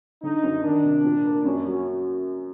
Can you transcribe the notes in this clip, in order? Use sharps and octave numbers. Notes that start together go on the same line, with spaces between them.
D3 D#4
F#2
D#3 D4
C3
A#2
A#3
F#2 C#4
F#3